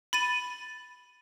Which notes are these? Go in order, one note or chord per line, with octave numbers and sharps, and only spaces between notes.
B5 A6 D#7